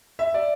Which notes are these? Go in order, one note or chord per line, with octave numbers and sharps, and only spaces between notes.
E5
D5